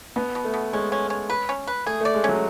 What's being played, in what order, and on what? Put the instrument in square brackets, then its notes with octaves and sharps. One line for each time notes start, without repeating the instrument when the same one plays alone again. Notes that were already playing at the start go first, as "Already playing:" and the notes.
[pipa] B2 [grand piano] B3
[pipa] B2
[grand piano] A3
[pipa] B2
[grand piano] G#3 [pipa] C#4
[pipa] C#4
C#4
B4
C#4
B4
[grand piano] A3 [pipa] G#4
[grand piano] A3
[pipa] D5
[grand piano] G#3
[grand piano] F#3 [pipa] C#4